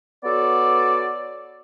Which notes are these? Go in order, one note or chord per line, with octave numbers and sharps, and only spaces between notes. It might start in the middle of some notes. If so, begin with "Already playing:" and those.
B3 F#4 A4 C#5 D5